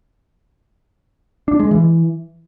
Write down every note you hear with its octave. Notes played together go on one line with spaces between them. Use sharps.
D4
G#3
E3